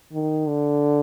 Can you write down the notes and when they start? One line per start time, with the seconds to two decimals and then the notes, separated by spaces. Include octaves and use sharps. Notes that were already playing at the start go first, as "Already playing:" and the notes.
0.13 D#3
0.48 D3